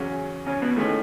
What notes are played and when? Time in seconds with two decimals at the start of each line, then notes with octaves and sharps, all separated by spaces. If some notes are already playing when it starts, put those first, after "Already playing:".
Already playing: E2 C#3 F#3 C#4
0.47 C#3 C#4
0.62 B2 B3
0.76 A2 D#3 G#3 A3 C#4 G#4